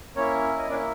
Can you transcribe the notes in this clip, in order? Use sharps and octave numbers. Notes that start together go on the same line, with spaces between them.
A#3 C#4 E4 C#5
D#5
A#3 C#4 D4 E4 D5